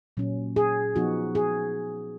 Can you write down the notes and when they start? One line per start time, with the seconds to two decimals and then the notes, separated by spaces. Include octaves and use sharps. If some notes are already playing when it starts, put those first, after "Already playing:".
0.17 A#2 F#3 C#4
0.56 G#4
0.95 F3 B3 D#4 F#4
1.35 G#4